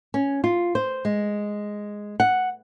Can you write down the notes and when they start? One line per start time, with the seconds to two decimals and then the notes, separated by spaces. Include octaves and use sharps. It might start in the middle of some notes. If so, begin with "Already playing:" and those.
0.14 C#4
0.44 F4
0.75 C5
1.05 G#3
2.20 F#5